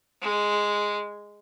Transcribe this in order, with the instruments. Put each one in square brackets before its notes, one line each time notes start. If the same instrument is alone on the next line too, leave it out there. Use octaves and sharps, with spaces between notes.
[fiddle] G#3